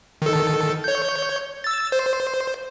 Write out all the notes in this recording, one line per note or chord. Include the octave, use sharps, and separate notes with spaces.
D#3 A4
C#5 G6
E6 A6
C5